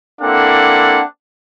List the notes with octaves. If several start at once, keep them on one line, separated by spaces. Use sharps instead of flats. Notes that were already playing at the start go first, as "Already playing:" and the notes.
A#3 C4 D4 E4 A4 F#5